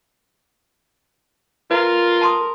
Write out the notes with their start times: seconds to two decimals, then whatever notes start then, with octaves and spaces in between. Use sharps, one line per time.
1.71 F4 A#4 B4
2.21 A5 C6 D#6